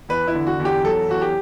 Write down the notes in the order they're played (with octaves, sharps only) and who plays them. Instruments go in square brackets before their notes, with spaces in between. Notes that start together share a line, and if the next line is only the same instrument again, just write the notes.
[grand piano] E2 B4
E4
D3
F#4
E2
G4
F#3 A4
E2 F#4
G4